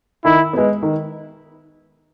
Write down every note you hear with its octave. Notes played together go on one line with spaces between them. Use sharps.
D#3 E4
G#3 B3
D#3